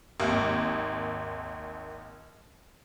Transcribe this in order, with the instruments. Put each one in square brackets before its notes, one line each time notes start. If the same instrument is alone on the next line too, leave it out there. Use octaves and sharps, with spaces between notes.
[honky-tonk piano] G#1 D#2